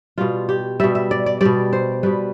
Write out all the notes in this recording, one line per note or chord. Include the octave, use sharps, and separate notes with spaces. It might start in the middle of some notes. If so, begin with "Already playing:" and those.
B2 G3 F4
G4
B2 G3 E5
E5
D5
D5
B2 G3 D5
C5
B2 G3 B4